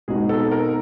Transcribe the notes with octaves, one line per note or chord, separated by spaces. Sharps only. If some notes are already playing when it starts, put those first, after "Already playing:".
B2 G#3 C4 D#4 F#4 G#4
A4
A#4